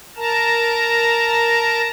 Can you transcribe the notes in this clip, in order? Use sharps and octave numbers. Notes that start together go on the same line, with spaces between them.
A#4 A5 A#5